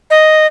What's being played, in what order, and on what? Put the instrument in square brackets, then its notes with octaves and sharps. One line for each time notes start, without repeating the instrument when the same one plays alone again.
[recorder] D#5